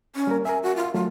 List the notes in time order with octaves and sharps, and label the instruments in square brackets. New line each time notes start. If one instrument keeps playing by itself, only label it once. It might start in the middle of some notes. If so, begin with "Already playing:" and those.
[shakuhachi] C#4
[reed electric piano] G3 A#3 A#4
[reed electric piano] A#4 E5 [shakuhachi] G#5
[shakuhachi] F#4
F4
[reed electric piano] F#3 A3 [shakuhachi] F4